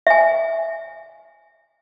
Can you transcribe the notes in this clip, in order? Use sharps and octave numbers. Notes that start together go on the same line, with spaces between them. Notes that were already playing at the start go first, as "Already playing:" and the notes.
E5 G#5